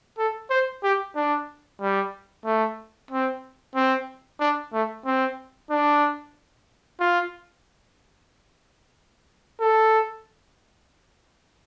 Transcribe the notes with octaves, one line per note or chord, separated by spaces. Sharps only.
A4
C5
G4
D4
G3
A3
C4
C4
D4
A3
C4
D4
F4
A4